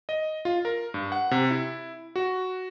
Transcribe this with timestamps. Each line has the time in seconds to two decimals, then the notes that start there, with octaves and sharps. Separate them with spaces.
0.09 D#5
0.45 F4
0.65 A#4
0.94 G2
1.12 F#5
1.31 C3
1.51 E4
2.16 F#4